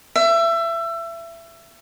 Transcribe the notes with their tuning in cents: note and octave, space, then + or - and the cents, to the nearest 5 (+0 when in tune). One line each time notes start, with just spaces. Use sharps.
E5 +25